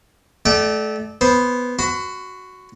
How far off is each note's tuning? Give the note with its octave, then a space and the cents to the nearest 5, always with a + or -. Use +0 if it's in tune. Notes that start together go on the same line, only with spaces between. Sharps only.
A3 -25 D5 +20 G5 -45
B3 +0 C5 +0
F#4 +0 B5 +40